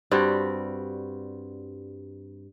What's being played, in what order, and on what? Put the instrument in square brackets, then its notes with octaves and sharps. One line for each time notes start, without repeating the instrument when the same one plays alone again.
[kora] G2 G3 C4 F#4